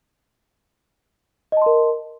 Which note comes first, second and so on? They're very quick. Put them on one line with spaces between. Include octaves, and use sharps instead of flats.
D#5 A5 C6 A#4